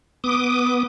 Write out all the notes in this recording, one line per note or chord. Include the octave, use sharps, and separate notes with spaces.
B3 D6 D#6